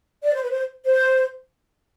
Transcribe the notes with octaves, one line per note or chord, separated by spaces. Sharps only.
D5
C5
B4
C5
C5